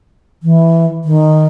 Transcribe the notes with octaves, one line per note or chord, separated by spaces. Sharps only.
E3
D#3